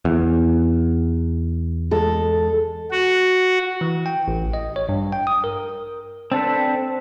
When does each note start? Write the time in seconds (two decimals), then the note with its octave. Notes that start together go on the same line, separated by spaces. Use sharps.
0.05 E2
1.91 G#3 A4
2.91 F#4
3.81 E3
4.06 G5
4.28 A1
4.54 D#5
4.76 C#5
4.89 G2
5.13 G5
5.27 D#6
5.44 A#4
6.32 C4 D4 A4 B4